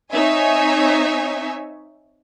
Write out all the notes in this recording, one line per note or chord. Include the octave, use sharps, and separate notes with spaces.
C4 D#4 C#5 E5 G#5